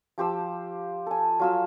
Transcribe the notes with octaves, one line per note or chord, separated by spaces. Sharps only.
F3 G4 C5 E6
A4 G#5
F#3 F4 E6